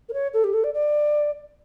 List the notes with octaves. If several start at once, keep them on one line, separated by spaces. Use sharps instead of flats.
A#4
C#5
A4
G4
A4
D5
D5